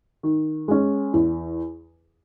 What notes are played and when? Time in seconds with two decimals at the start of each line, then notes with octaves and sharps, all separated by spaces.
0.23 D#3
0.68 G#3 C#4
1.13 E2